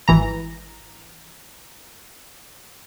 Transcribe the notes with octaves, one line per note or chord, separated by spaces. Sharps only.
G#1 E3 A#5